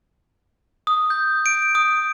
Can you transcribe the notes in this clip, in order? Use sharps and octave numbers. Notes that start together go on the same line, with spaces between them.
D#6
G6
D7
D#6